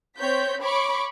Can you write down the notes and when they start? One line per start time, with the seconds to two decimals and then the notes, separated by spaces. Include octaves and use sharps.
0.17 C4 C#5 G6 B6
0.60 C#5 B5 C#6 D6